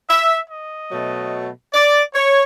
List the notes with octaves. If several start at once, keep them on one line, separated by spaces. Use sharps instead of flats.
E5
D#5
B2 F#3 A3
D5
C#5